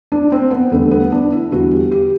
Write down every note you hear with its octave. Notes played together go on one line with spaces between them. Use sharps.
D4
C4
B3
E2 D3 G3 A3
B3
D4
E4
E2 D3 G3 F#4
G4
G4